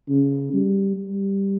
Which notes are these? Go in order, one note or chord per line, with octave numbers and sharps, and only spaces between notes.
C#3
G3
G3